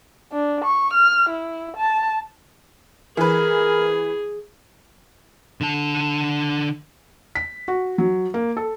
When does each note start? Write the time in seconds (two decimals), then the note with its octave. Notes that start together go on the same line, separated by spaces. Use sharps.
0.32 D4
0.65 C#6
0.94 F6
1.29 E4
1.77 A5
3.17 E3 G#4 A#4 B4
5.61 D3 A5
7.35 B6
7.68 F#4
7.98 F#3
8.34 A#3
8.57 A4